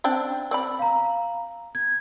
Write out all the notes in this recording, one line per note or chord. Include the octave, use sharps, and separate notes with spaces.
C4 D4 G5
C4 D5 B5
F5 A#5
G#6